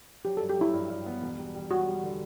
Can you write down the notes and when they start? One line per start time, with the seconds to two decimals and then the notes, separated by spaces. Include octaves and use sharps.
0.25 F#3 G4
0.37 G2 A4
0.49 G4
0.57 F#3 E4
0.73 G2
0.90 G2
1.06 B3
1.22 E1
1.38 G3
1.55 G3
1.71 G3 F#4
1.88 G3
2.04 D3